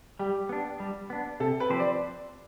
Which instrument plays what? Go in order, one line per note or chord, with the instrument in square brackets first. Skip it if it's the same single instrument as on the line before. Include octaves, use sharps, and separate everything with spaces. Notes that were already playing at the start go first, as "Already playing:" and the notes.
[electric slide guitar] G3 [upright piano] G4
[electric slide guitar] B3 D4
G3
B3 D4
[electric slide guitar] C3 [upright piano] A4
[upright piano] B4
[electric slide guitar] F3 C4 G4 C5
[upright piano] D5